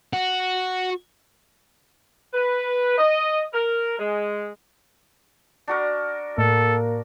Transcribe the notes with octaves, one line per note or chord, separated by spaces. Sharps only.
F#4
B4
D#5
A#4
G#3
D4 F#4 A#4
A2 A#3 A4